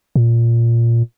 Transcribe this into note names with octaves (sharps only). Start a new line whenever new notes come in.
A#2